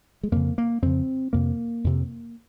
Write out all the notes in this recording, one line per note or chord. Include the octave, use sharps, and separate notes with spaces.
G#3
F2 C#3 A#3
A#3
F2 C#3 C4
F2 C3 A#3
F2 C3